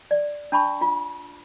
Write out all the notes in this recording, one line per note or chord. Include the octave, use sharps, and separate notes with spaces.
D5
D4 A5 B5 C#6
F4